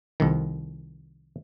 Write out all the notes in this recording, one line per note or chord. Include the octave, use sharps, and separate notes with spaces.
C2 F2 D#3